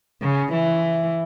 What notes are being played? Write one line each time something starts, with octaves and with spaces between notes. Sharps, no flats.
C#3
E3